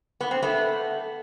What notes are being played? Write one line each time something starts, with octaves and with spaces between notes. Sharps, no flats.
B3
C4
A3 B3